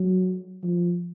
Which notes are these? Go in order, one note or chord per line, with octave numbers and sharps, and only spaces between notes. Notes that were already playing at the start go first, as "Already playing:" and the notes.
Already playing: F#3
F3